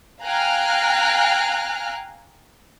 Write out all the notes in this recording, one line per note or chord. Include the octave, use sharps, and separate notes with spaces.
F5 G5 G#5 A#5 F6 F#6